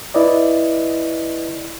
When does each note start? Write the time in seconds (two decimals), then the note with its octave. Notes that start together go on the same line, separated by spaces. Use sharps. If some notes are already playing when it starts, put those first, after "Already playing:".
0.14 E4 B4 D5 D#5